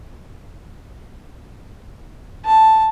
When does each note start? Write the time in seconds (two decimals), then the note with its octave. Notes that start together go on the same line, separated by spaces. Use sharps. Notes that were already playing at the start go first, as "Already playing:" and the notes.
2.46 A5